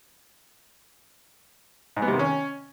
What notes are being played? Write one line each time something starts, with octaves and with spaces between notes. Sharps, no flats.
G#2
B3
C3
D#3
C#4